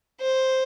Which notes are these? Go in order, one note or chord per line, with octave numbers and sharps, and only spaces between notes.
C5